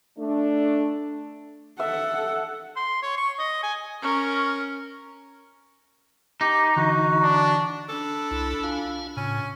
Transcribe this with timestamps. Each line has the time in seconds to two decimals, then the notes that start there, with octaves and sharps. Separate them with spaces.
0.18 A3 D4
1.80 A4 E5 F#5
2.76 C6
3.02 C#5
3.17 C#6
3.39 D#5
3.63 G#5
4.01 C#4 A#4
6.41 D#4 G4
6.76 D3 E3 F#4
7.23 D4
7.89 D4 A4 B5
8.31 C2 E4
8.64 F4 F5 G#5
9.17 A2 C#3 C#4